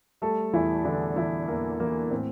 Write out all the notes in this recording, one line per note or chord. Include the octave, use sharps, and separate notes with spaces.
G3 A3 A4
E2 E3 E4
D3 E3 D4
E3 E4
E2 A#3
E3 A#3
A2 C4